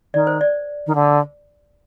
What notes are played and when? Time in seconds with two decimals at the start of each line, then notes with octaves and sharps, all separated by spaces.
0.14 D#3 D5
0.27 C5
0.41 D5
0.87 D#3
0.95 D3